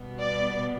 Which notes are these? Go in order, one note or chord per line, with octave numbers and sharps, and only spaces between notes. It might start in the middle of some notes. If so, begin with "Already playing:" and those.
Already playing: B2 G3 B3
D5